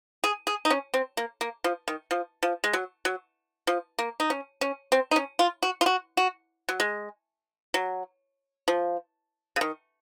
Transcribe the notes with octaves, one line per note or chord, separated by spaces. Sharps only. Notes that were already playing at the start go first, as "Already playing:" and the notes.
G#4
G#4
D#4
C#4
C4
A#3
A#3
F3
D#3
F3
F3
G#3
F#3
F#3
F3
A#3
D#4
C#4
C#4
C4
D#4
C#4
F4
F#4
F4
F#4
F#4
F#3
G#3
F#3
F3
C#3
D#3